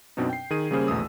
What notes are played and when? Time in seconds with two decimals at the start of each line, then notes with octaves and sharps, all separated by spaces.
0.17 F#2 B2 C4 D4 D#4
0.29 G5 C7
0.51 D#3 G#4 D#7
0.71 C#3 G3 A#3 C#4 G#4 C5
0.87 A#1 E2 B2 A3 D#6 E6